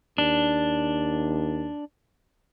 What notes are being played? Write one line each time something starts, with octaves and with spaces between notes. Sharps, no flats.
D#2 D4